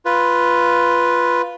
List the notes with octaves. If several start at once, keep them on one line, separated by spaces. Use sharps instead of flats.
F4 B4